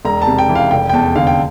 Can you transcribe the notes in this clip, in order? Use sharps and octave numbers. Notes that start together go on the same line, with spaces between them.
E1 A#5
A5
C3
G5
E3
F5
F1 G5
G5
E2 A5
D3 F5
G5